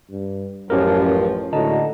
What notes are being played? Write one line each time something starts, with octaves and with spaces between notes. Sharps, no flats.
G2
A1 F#2 F3 C#4 G4 A#4
C#2 A2 D3 F#4 D#5 A5 A#5